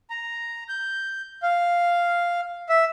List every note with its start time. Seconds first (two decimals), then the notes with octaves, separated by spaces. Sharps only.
0.10 A#5
0.69 G6
1.43 F5
2.69 E5